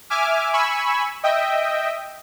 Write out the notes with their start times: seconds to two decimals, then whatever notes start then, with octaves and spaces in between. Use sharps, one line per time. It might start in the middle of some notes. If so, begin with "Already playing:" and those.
0.10 E5 G#5 D6 F6
0.53 G#5 B5 C#6 E6
1.24 D#5 E5 G5